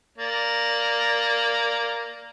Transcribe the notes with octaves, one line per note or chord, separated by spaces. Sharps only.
A#3 D5